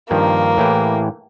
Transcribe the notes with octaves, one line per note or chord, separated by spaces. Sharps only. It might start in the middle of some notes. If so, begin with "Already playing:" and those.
G2 D#3 F3 A#3
A2 E3 G4